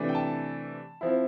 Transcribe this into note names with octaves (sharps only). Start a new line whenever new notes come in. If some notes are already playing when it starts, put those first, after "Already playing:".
Already playing: C3 E3 A3 D4
G5
A5
F3 C4 E4